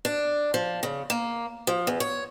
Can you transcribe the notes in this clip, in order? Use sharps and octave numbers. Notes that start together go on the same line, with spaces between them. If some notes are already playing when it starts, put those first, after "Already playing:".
D4
F3
C#3
A#3
F3
E2
C#5